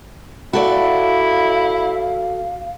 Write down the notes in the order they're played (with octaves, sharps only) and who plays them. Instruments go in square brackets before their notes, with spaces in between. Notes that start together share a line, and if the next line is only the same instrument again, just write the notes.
[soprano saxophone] E4 [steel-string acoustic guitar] F#4 A4 D5 [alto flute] F5